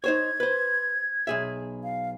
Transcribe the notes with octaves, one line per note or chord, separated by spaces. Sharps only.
D#4 C5 C#5 G#6
B4 C5
B1 G#4 E5
F5